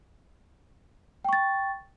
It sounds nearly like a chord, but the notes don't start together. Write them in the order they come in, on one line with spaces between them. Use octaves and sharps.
G5 C#6 A6